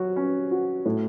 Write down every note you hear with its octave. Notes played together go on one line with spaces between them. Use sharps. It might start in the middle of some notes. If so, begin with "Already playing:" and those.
Already playing: F#3 F#4
C#4
F#4
A2